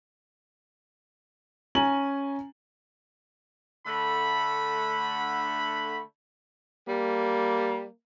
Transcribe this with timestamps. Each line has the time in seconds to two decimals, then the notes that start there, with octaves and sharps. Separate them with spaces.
1.75 C#4 G#5 A#5 F#7
3.86 D3 A3 B5
6.88 G3 A#3